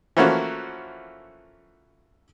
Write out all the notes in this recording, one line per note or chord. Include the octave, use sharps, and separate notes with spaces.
E3 F3 A3 A#3 C#4 F#4